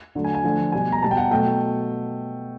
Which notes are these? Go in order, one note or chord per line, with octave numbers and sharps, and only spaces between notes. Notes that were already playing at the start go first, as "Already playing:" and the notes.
D3 F#3 A3
G#5
G#5
D3 F3 A3
B2 G3 G#5
A#5
B2 G3 A5
G5
F#5
B2 F#3 A3 G5